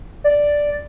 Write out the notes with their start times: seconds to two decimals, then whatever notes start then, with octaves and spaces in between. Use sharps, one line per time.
0.24 D5